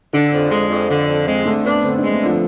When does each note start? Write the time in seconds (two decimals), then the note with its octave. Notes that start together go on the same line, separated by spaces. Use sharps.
0.13 D3 D4
0.32 F2
0.51 G#3
0.69 F2
0.89 D3
1.07 F2
1.26 G#3 C4
1.45 D3 A3
1.65 B3 D4
1.83 D3 C4
1.98 G#3 D4
2.12 A3
2.22 D3 F3